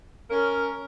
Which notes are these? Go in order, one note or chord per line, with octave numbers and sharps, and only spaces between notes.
C#4 A#4